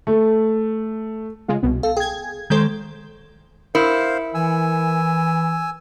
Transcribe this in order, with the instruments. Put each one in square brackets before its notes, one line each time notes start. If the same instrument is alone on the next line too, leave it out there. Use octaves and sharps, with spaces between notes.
[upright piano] A3
[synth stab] C#3 G#3 F4
C2 B2
[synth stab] A4 [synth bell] F5
[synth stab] G#4 G#6 [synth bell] G5
[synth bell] D#3 G#3 A4 [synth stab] C5 G6
[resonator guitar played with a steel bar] E4 [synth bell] A#4 [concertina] C5 F5
[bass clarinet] E3 [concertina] G#5 E6